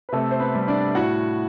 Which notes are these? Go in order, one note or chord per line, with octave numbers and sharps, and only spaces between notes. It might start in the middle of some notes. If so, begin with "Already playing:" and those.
B4
C3 A3 A4
C5
B3 B4
G3
D4 D5
A2 F#4 F#5